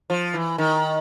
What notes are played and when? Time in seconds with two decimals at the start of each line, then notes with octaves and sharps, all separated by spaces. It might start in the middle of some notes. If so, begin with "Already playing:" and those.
0.10 F3
0.34 E3
0.58 D#3